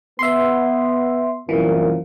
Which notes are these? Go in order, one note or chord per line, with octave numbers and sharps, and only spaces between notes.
B3 E5 C6
C2 F#2 A#2 E3